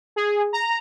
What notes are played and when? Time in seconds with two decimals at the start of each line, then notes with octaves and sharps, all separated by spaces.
0.16 G#4
0.53 A#5